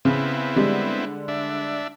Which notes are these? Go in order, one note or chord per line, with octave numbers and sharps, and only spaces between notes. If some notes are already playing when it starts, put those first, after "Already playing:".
C#3 B3 C4 E4
D3 G3 G#3
D4 E5